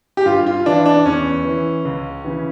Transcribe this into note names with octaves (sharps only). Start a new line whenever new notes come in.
G4
G2 F4
F4
E3 D4
D4
E2 C#4
E3
C#2
C#3 E3